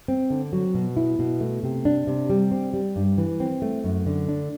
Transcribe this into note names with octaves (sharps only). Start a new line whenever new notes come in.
C4
D3
F#3
B2
E4
B2
A3
C3
D4
C3
G3
C4
G3
G2
E3
C4
A3
F#2
D3
D4